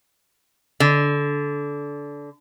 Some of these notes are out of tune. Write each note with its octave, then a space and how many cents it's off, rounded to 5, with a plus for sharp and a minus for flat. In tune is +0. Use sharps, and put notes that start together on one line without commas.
D3 -20